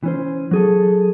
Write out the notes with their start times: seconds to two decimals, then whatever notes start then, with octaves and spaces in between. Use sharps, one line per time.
0.03 E3 C#4 C5
0.51 F#3 G#4 A4